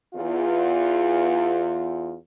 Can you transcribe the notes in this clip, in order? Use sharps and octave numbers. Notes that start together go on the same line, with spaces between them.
E2 F4